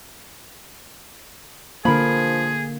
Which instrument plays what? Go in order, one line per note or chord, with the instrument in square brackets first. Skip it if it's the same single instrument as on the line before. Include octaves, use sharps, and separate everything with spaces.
[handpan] D3 A#3 [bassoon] F3 [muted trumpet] G#4 [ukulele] A#4 B5